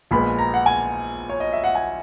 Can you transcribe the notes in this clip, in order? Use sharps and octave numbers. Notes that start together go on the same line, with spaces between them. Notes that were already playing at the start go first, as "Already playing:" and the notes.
A#1 A#2 G#3 B3 B5
A#5
F#5
G#5
C#5
D#5
E5
F#5
G#5